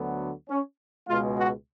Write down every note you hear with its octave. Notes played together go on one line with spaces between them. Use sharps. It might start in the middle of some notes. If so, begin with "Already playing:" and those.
Already playing: D2 D3 F#3 B3
C#4
C#2 B2 G#3 F4
F#4